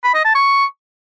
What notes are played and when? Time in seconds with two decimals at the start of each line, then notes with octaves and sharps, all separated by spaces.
0.04 B5
0.15 D#5
0.25 A5
0.35 C#6